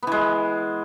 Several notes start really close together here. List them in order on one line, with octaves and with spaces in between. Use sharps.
B3 E3 G#3